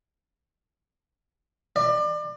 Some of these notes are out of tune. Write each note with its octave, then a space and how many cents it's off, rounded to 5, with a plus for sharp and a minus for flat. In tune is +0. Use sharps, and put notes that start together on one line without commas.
D5 +30